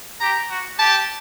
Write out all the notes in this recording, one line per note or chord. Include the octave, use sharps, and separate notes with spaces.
G4 A#5
F#4
G4 A5